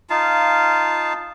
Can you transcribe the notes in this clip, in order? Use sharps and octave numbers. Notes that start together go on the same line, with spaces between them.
D#4 F4 F5 A5